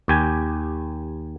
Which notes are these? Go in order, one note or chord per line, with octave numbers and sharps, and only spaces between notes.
D#2 G4 G#5